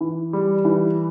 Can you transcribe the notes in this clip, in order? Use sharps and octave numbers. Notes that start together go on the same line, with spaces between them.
E3
G3
E3